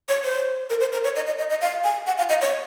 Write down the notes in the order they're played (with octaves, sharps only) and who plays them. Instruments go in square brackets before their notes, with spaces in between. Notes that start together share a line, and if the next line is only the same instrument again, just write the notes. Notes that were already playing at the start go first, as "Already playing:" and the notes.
[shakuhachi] C#5
C5
A#4
C5
A#4
C#5
D#5
D#5
D#5
D#5
F5
G#5
F#5
F5
D#5
C#5